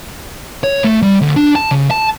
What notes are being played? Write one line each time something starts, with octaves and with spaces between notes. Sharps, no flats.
C#5
A3
G3
D2
D4
A5
C#3
A5